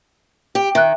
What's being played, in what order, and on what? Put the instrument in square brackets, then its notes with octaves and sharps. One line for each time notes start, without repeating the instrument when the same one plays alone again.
[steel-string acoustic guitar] G4
[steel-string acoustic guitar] D#3 [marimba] E5 F#6